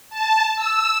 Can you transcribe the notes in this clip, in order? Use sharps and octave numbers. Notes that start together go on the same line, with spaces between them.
A5
E6